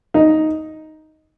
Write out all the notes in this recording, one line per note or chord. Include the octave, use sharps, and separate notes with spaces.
D#4